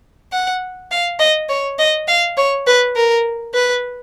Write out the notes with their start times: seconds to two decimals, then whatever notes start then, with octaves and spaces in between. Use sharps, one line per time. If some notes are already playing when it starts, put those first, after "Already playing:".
0.32 F#5
0.91 F5
1.19 D#5
1.49 C#5
1.79 D#5
2.08 F5
2.37 C#5
2.67 B4
2.96 A#4
3.54 B4